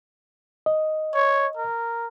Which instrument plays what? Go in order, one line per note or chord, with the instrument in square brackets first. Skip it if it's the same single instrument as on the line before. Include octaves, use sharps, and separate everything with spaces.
[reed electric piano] D#5
[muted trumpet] C#5
A#4